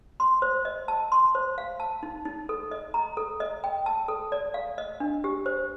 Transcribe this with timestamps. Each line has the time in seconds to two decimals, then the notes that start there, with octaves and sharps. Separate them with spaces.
0.20 C6
0.42 C5
0.65 D#5
0.88 A5
1.12 C6
1.35 C5
1.58 F5
1.80 A5
2.03 D#4
2.25 D#4
2.49 A4
2.71 D#5
2.94 A#5
3.17 A4
3.40 D#5
3.64 G5
3.86 A5
4.08 A4
4.32 D5
4.54 F5
4.78 D#5
5.00 D4
5.24 G4
5.46 C5